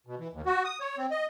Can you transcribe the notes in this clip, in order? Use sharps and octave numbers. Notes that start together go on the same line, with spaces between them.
B2
E3
D#2
F#4
D#6
C#5
C4
D#5